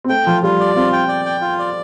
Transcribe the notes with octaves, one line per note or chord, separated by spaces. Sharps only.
C4
A3 G5
F3 F4
G3 F4
D5
C4 F4
G5
D5
G5
F4
D5